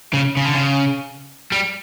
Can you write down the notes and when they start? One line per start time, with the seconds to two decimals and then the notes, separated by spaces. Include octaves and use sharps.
0.13 C#3
0.37 C#3
0.45 D3
0.54 C#3
1.52 G3